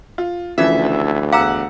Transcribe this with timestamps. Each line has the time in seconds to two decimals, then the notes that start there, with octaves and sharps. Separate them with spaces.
0.18 F4
0.58 D2 C#3 E3 F3 E5
1.32 E2 F5 F#5 A#5 D6 E6